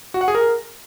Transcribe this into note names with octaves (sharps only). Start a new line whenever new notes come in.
F#4
F#5
G#4
A#4